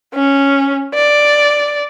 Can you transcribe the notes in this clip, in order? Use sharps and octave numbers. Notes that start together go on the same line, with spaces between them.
C#4
D5